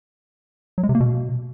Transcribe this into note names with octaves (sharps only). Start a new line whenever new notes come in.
F#3
G#3
C3
A#3
B2